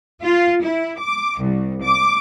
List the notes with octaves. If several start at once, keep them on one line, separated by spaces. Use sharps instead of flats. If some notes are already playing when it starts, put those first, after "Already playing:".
F4
E4
D6
C2
D6